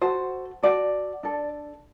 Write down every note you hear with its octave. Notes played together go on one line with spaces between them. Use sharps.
F#4 A4 C5
F#4 A4 D5
D4 A4